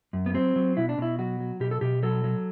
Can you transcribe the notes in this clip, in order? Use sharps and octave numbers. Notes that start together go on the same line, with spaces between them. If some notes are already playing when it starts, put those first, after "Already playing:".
F#2
B3
F#3 C4
F#3
B2 E4
D4
B2 E4
F#3 F#4
F#3
B2 G4
A4
B2 G4
F#3 A4
F#3